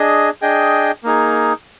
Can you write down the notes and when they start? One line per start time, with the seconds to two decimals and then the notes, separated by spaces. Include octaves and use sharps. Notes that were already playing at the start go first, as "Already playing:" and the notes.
Already playing: D4 G#4 D#5
0.42 D4 G#4 D#5 G5
1.03 A#3 D#4 G#4